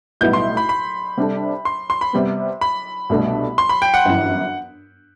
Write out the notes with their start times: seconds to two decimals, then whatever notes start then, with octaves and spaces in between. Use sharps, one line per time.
0.21 B1 A2 G3 B3 E4 G6
0.33 C6
0.57 B5
0.69 B5
1.17 C3 G3 D4 A4
1.65 C6
1.90 C6
2.01 B5
2.13 C3 G3 B3
2.61 B5
3.09 C2 B2 A3 D4
3.58 C6
3.69 B5
3.82 G5
3.94 F#5
4.05 G1 F#2 E3